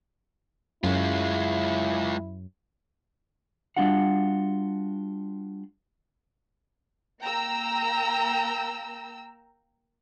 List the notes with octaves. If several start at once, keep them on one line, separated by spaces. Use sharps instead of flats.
F#2 G#3 E4 F4
G3 D4 F4 F#4 F#5
A#3 G5 A#5 E6